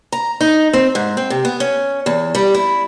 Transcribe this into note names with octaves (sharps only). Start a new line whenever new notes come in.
A#5
D#4
C4
G#2
C4
C3
B3
C#4
E2
G3
E4